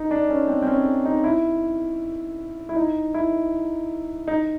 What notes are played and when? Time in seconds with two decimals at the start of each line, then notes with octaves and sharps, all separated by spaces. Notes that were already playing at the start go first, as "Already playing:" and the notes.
Already playing: D#4
0.11 D4
0.30 C#4
0.48 C4
0.63 C4
0.67 C#4
1.05 D#4
1.24 E4
2.69 E4
2.76 D#4
3.14 E4
4.28 D#4